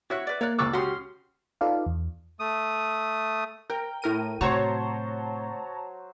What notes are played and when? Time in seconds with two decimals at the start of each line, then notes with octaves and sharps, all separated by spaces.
0.10 E4 F#4 C#5 E5 F#6
0.27 B4 D5
0.41 A#3 C#5 D5 F#6
0.59 C#2 D5 C#6 D6 E6 F#6
0.73 C#4 F#4 G4 C6 D#6
1.61 D#4 F4 A4 B4 D5 F5
1.86 E2
2.40 A3 D#6
3.70 A#4 G5
4.02 A2 A#4 D#7
4.41 A2 C3 F#3 C5 C#5 A5 A#5 C#6